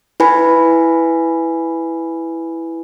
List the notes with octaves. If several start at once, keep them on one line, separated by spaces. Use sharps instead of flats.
E4 B4 G#5 B5